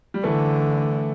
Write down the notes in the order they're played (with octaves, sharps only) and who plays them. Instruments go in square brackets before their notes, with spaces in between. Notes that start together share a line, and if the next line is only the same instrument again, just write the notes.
[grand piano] G3
[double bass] D3 [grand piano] E3 A3